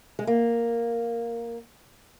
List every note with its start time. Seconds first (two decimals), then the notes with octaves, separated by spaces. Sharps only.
0.19 G#3
0.27 A#3